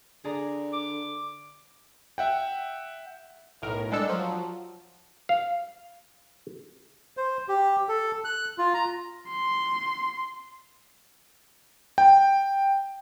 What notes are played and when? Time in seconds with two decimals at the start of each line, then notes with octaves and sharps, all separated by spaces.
0.24 D3 G#4 D5 A#5
0.73 D6
2.18 E5 F#5 G5
3.62 B1 A2 A#4
3.91 G3 G#3 D4 A4 E6
4.08 F3 F#3
5.29 F5
7.17 C5
7.48 G4
7.89 A4
8.25 F#6
8.58 F4
8.74 A#5
9.29 C6
11.98 G5